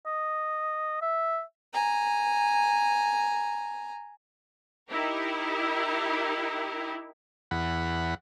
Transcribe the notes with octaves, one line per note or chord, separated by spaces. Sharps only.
D#5
E5
G#5 A#5
D#4 E4 G4 A#4
E2 F#5 B5